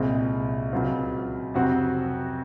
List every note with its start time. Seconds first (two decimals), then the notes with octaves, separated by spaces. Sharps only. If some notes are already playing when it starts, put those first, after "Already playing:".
Already playing: C2 A#2 G#3 C4
0.72 C#2 C#3 F#3 C4 F4
1.54 F2 C3 F#3 C4 F#4